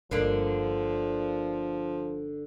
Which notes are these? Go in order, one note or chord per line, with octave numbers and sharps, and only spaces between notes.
G1 D3 F3 A#3 D4